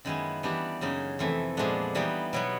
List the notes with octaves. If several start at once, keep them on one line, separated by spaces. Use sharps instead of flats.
F#2 D#3 G#3 B3 E4
E3 G3 B3 D4 G4
F#2 C#3 F#3 A#3 D#4
F2 C3 E3 A3
A#2 F3 G#3 B3 D4
E3 G3 B3 D#4
B2 F#3 B3